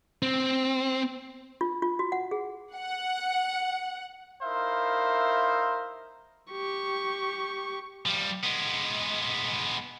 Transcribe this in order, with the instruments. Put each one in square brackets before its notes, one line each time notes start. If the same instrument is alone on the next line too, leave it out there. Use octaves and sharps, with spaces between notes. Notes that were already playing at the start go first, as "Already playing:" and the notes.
[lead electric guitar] C4
[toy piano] F4
F4
F#4
F#5
G#4
[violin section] F#5
[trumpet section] D#4 E4 A#4 C5 E5 F5
[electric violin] G4 C#6
[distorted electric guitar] F3 G3
G#3 B3